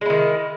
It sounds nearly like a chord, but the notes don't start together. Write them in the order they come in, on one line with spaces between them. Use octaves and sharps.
G#3 E4 D#3